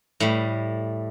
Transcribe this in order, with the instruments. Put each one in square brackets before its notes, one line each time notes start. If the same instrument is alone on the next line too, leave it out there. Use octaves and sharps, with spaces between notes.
[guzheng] A2 G3